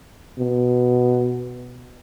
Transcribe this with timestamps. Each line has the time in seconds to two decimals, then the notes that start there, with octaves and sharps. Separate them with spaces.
0.39 B2